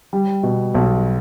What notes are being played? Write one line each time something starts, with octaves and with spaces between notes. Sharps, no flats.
G3
B2
B1